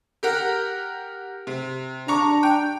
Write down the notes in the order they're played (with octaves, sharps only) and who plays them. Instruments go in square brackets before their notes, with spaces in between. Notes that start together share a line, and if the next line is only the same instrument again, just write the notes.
[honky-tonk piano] G4 A#4 F#5
C3
[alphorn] D4 [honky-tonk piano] A#5 C#6 D6
[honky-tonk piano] G5